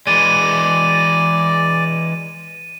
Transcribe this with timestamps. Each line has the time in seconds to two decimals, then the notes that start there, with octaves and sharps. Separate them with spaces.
0.07 E3 G#3 D5 D#7